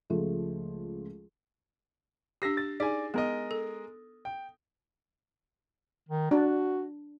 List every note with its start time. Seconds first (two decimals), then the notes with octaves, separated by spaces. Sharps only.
0.10 C#2 F3 G#3 A3
2.42 D4 G4 E6 A#6 C7
2.57 A6
2.80 D#4 G#4 D5 G#5
3.14 G#3 B3 A#4 D#5
3.51 A4
4.25 G5
6.09 D#3
6.31 D4 F#4